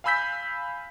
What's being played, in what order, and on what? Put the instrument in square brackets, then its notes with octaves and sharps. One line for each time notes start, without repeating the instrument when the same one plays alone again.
[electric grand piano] F5 G#5 B5 E6 G6 B6